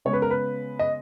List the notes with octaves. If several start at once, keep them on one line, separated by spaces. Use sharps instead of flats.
C#3 G#3 B3 C#5
B4
A#4
B4
D#5